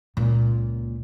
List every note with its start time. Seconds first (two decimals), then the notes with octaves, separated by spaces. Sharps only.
0.17 C#2 A#2